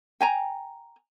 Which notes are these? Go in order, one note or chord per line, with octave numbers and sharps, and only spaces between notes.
G5 G#5 A#5